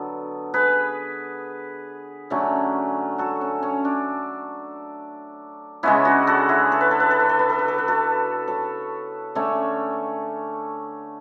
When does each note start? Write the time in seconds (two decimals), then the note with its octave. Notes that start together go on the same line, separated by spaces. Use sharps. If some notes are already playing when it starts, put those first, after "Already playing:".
Already playing: D3 F#3 B3 A4
0.54 G#4 B4
2.30 D3 F#3 A3 C#4
3.18 F#4 A4
3.41 C#4
3.63 C#4
3.85 D4
5.83 C#3 G#3 B3 C#4 E4
6.05 D4 F#4
6.27 F#4 A4
6.49 E4 G#4
6.72 A4
6.81 B4
6.91 A4
7.00 B4
7.11 A4
7.20 B4
7.29 A4
7.39 B4
7.49 A4
7.59 B4
7.68 A4
7.78 B4
7.88 F#4 A4
8.48 A4 C#5
9.35 D3 A3 C#4 A4 C#5